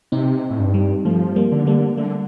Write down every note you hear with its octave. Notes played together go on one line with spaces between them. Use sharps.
C3 C4 D#4
A2
G2
G3
F3 A3
G3 A#3
D3
G3 A#3
D3 A3